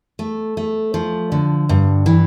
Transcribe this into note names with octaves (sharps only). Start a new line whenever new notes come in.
A3
A3
F3
D3
G2
E3